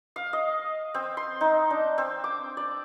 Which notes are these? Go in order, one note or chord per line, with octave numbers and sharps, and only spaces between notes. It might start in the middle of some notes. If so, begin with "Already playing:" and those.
F5
D#5
C4
C6
D#4
D4
C4
D6
D5